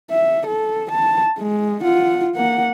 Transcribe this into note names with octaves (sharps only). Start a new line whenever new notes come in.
E5
A4
A5
G#3
F4 F#5
A#3 F#5